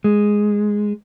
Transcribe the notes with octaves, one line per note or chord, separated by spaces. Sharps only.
G#3